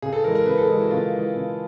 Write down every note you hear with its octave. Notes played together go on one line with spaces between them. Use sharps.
C#3 G#4
A4
E3 G#3 A#4
A#4
C#3 B4
A4
E3 G#3 G#4
F#4
C#3 F4
E3 G#3
C#3